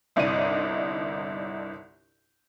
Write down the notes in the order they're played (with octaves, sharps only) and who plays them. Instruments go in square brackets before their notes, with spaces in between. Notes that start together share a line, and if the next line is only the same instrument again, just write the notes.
[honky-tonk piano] G1 C2 D4 D#4 D5 D#7